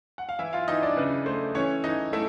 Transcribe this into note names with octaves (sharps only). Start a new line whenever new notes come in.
F#5
F5
E3 E4 E5
F4 F5
E3 D#4 D#5
D4 D5
C#3 B4
A3 C5
E3 C#4 C#5
E3 D#4 D#5
A3 E4 E5